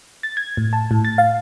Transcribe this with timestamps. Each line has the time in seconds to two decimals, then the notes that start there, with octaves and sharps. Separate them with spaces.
0.23 A6
0.37 G#6
0.57 A2
0.73 A5
0.91 A2
1.05 A6
1.18 F5